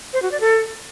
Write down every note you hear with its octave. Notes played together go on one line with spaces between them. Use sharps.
C5
F#4
D5
A4